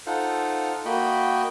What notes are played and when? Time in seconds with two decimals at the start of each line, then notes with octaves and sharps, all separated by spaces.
0.07 D#4 F4 A4 C5 F5 F#5
0.85 A#3 F#4 D#5 G5 B5